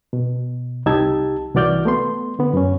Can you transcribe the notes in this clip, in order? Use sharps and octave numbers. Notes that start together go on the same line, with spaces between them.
B2
C2 D#4 G4 A5 E6 G#6
C2 E3 F#4 D5 F6 G6
A3 B3 C6
D3 B3
F#2 C#4